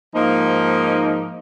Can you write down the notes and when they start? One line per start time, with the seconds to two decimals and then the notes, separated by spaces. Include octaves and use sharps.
0.14 G#2 F3 A#3 D#4